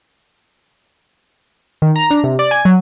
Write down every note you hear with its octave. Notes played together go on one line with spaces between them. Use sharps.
D#3
A#5
D4
C3
D5
G#5
F#3